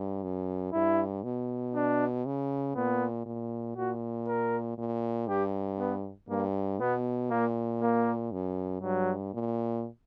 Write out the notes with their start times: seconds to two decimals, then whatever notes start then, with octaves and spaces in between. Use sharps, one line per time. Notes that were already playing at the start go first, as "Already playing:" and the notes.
Already playing: G2
0.23 F#2
0.73 G2 E4
1.24 B2
1.75 D4
2.26 C#3
2.75 A#2 B3
3.26 A#2
3.76 A#2 F#4
4.28 A#4
4.78 A#2
5.29 G2 G4
5.79 B3
6.29 G2 A#3
6.80 B2 B3
7.30 A#2 A#3
7.82 A#3
8.32 F#2
8.82 G2 F#3
9.34 A#2